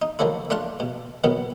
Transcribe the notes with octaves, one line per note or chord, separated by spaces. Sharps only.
D#4
D#3 F3 F#3 A3 E4
A3 D4 F4 F#5 A5
B2
B2 D#3 F#3 B3